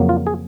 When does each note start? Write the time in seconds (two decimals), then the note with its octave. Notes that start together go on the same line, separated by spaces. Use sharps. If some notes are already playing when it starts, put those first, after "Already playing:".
Already playing: F2 C#3 F#3 A#3
0.09 F4
0.27 G#4